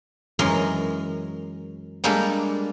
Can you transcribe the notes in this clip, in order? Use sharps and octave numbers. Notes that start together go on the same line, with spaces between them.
F#2 E3 G#3 A#4 C6
G3 G#3 A#3 D4 G4 A4